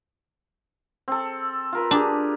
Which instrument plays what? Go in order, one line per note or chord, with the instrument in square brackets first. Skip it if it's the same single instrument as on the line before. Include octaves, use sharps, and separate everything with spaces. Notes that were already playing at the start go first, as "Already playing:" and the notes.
[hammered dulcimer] C4 A4
F4 A#4 B4
[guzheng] D4 [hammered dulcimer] G4 G#4